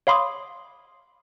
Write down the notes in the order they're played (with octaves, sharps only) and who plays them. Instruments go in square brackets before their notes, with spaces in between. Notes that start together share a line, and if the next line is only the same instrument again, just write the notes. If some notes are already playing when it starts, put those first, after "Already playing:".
[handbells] C#5 F5 B5 C6 D6 D#6